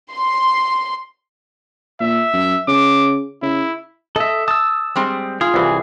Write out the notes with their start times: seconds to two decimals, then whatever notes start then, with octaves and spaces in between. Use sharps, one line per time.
0.12 C6
2.00 A#2 E5
2.34 F#2
2.68 C#3 D6
3.42 C#3 E4
4.16 A4 D#5 E5
4.48 A5 D#6 E6
4.96 G3 G#3 C4
5.41 F4 G#4
5.54 C2 E3